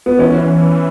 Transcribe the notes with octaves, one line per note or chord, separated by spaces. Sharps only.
B3
E3 C#4